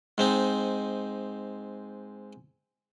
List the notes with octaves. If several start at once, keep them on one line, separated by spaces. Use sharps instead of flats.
G#2 C4 D#4